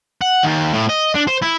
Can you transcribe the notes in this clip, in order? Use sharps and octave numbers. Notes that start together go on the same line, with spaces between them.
F#5
D#2
A2
D#5
D4
C5
E4